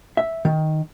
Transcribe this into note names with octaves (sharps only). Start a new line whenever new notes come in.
E5
D#3